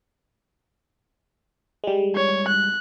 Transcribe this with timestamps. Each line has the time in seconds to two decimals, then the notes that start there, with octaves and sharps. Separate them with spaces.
1.84 G3 G#3
2.16 C#5
2.48 F#6